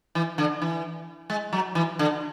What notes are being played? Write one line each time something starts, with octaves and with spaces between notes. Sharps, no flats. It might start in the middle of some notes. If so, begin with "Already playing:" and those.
E3
D3
E3
G#3
F#3
E3
D3